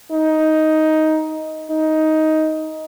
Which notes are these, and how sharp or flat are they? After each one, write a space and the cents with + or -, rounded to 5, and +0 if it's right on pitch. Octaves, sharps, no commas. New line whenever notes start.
D#4 +10
D#4 +10